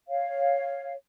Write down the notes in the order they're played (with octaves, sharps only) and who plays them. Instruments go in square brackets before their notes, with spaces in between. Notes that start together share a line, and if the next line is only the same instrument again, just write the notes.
[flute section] C#5 F5